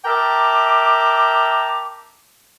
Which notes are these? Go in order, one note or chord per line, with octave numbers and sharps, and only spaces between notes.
A#4 E5 G5 A5 A#5 D6